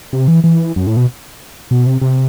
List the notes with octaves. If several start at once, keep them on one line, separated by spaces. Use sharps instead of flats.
C3
E3
E3
F#2
A2
B2
B2
C3
C3